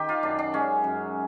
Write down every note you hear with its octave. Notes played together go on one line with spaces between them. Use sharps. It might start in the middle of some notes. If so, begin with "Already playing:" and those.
Already playing: D#3 G4
F4
F#2 D4
D4
G#3 C#4
F#2